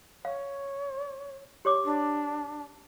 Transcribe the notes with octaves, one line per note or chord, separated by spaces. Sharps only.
C#5 F5
G4 C#5 D6
D4